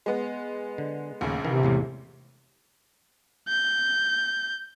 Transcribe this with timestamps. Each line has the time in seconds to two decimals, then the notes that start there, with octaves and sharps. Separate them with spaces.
0.06 G#3 B3
0.78 D3
1.21 A#1 D#2 C#3 A3
1.45 C3 D#3 E3
1.63 E2 A2 G#3
3.49 G6